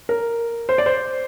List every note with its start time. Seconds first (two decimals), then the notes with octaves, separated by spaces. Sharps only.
0.09 A#4
0.69 C5
0.78 D5
0.86 C5